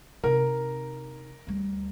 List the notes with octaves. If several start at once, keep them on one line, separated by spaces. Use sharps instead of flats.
C3 D#4 A#4
D2 G3